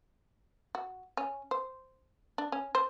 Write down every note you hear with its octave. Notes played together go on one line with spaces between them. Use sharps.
F#4
C#4
C5
D4
C#4
C5